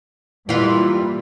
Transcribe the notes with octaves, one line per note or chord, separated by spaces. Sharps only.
A#2 E3 G3 F4